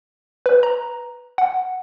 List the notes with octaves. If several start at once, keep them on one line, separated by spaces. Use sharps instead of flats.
B4
A#5
F#5